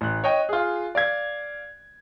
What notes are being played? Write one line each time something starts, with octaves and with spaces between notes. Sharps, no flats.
A1 F#6
C#5 D#5 G5
F4 G#4
D5 F5 G#6